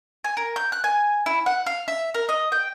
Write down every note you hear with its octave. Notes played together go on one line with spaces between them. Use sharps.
G#5
A#4
G6
F#6
G#5
E4
F#5
F5
E5
A#4
D#5
G5